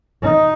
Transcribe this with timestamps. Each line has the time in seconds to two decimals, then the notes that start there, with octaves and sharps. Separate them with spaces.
0.23 D#4